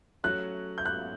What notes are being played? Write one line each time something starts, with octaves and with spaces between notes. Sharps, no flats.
F#3 A3 C#4 F#4 F#6
G6
F#6